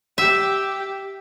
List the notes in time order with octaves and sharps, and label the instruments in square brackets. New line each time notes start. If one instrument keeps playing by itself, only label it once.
[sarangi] G4 [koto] E5